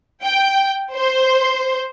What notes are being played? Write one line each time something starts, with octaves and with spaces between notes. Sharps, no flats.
G5
C5